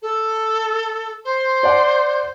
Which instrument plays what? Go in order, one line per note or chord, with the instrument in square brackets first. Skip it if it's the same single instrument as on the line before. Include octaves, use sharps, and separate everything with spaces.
[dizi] A4
C5
[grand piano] D5 F#5